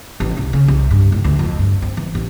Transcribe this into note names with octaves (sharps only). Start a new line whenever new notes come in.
A1
C2
C#3
C2
G2
A2
D2
F2
G2
C4
E3
A1